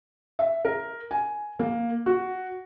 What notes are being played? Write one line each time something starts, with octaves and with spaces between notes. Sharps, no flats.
E5
A#4
G#5
A#3
F#4